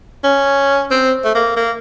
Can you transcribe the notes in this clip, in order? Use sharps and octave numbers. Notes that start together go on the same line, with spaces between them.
C#4
C4
A3
A#3
A#3